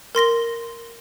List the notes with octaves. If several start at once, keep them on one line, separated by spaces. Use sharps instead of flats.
A#4 C6 A#6 G7